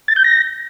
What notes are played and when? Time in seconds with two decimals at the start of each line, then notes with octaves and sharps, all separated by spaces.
0.08 A6
0.16 G6
0.24 A#6